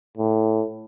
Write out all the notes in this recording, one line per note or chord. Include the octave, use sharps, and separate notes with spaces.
A2